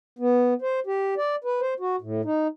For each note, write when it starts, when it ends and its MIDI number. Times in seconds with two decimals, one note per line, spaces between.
0.19 0.54 59
0.62 0.80 72
0.87 1.14 67
1.17 1.36 74
1.44 1.61 71
1.61 1.74 72
1.80 1.96 66
2.01 2.22 45
2.25 2.47 63